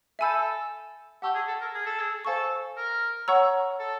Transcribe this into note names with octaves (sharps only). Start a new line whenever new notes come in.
A4 E5 G#5 B5 E6 G6
G4 F#5 A5 C#6 E6
G#4
A4
A#4
G#4
A4
G#4
A4 C5 F5 G#5 C#6
A#4
C#5 F#5 A#5 C#6 E6
A4